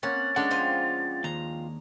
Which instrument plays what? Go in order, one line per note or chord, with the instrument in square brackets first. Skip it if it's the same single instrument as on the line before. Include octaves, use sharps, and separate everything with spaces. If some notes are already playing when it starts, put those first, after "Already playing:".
[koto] A#3 C#4 [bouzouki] C4 F#5 [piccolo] A6
[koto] G#3 D4 [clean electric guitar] C#4 F#5 [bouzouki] A4
[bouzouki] F3 C4 F4
[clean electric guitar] D#2 [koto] A#5